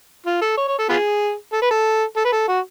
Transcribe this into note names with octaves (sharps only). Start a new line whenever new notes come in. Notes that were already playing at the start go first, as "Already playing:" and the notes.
F4
A4
C#5
C#5
A4
B3 F4 G#4
A4
B4
A4
A4
B4
A4
F#4